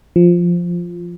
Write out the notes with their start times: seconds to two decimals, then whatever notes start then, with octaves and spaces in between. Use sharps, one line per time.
0.16 F3